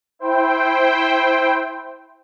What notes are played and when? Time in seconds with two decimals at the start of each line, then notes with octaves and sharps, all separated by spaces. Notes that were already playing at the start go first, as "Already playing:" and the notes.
0.19 E4 C5 G5